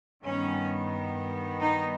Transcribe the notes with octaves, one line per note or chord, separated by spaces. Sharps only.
G2 D#3 G3 B3 C#4
D#4